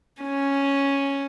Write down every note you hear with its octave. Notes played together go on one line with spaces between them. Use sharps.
C#4